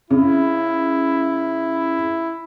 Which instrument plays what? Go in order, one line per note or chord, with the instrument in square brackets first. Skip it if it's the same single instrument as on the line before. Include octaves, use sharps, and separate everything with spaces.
[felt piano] C#3 [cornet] E4